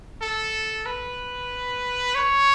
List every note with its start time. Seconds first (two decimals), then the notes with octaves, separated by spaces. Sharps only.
0.21 A4
0.86 B4
2.15 C#5